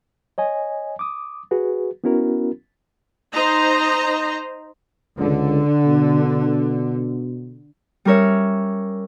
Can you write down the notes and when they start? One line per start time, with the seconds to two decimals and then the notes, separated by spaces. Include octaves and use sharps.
0.38 C#5 D#5 G#5
0.99 D6 D#6
1.51 F#4 G#4 B4
2.04 B3 C#4 E4 F#4 A#4
3.33 D#4 C5 D#5 A#5
5.18 C#2 D3
5.86 B2
8.05 G3 C#4 A#4 C#5 E5